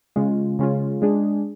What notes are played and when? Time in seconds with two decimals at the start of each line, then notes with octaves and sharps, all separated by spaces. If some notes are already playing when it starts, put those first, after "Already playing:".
0.16 C#3 G#3 C#4 F4
0.59 C#3 G#3 C#4 F4
1.02 G#3 D4 G#4